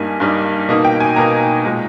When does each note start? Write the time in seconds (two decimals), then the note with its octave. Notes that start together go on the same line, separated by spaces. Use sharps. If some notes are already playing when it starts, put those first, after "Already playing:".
Already playing: G2 G3 A#3 D#4 G#5
0.20 G2 G3 A#3 D#4
0.68 B2 A#3 D#4 D#5
0.84 G5
1.00 G#5
1.16 B2 A#3 D#4 A#5
1.65 A#2 G#3 D#4